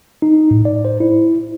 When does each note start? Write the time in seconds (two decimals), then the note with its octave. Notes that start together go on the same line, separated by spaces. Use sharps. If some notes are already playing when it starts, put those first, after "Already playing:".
0.22 D#4
0.51 A2
0.65 D5
0.85 C5
1.00 E4